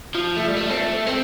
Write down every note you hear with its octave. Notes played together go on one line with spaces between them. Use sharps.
F3
A3
G3
A3
C4
A3
C4